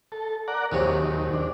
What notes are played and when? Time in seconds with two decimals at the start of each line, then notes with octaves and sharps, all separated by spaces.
0.12 A4
0.48 A#4 D5 F#5
0.72 A#1 D#2 C3 F#3
1.33 D4